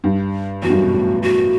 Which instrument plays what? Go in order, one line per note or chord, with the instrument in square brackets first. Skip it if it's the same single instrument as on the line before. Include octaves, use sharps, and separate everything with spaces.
[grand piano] G2
[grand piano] E2 [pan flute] F#4
[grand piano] G2
F#2
B2
A2
[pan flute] F#4